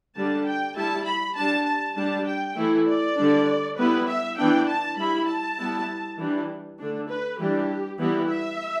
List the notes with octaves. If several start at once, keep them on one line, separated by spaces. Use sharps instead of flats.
D3 G3 D4 A5
G5
G3 E4 A5
B5
G3 D4 A5
A5
G3 D4 A5
G5
E3 A3 E4
D5
D3 G3 D4
G3 B3 E4 B4
E5
E3 B3 D4 G5
A5
G3 E4 B5
A5
G3 B3 E4
E3 G3 D4
D3 A3 D4
B4
E3 G3 D4 G4
E3 G3 B3 E4 G4
E5